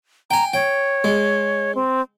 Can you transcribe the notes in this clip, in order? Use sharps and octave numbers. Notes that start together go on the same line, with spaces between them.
G5 G#5 A#5
C#5 G5
G#3
C4